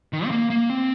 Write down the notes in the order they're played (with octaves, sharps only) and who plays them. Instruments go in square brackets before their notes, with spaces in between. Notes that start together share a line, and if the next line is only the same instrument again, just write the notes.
[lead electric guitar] D#3
C4
A#3
A#3
C4